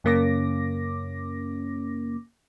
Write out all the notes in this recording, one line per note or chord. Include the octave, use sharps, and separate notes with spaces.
F#2 C#3 A#3 C#4 D6 A#6